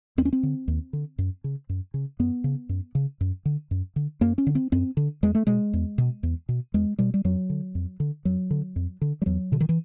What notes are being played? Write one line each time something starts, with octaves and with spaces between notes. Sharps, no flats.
D#2 C4
C#4
C4
D3
D#2
D3
F#2
C#3
F#2
C#3
F#2 B3
C#3
F#2
C#3
F#2
D3
F#2
D3
F#2 A#3
C#4
D3
C4
F#2 C4
D3
E2 G#3
A3
B2 G#3
E2
B2
E2
B2
E2 G#3
B2 G3
G3
F2 F#3
D3
F2
D3
F2 F#3
D3
F2
D3
G3
E2 F#3
B2 D3
D#3
E3